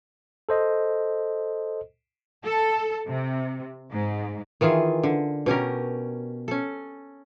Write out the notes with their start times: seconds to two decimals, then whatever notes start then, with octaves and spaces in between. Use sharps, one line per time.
0.49 A4 C5 D#5
2.46 A4
3.07 C3
3.91 G#2
4.61 D#3 E3 F4 G#4
5.03 D3
5.46 B2 C#4 G4 A#4
6.48 C#4 A4